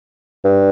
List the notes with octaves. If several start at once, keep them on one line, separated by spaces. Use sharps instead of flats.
G2